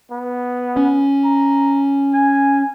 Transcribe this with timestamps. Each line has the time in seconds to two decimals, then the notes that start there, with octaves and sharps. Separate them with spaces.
0.11 B3
0.77 C#4
1.24 A#5
2.14 G#5